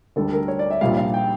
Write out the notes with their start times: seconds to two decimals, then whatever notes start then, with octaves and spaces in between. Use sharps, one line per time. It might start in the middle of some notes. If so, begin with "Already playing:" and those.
0.16 D2 D3 G3 A4
0.33 A#4
0.48 C#5
0.59 D5
0.70 E5
0.81 A#1 A#2 G3 F5
0.97 F5
1.14 G5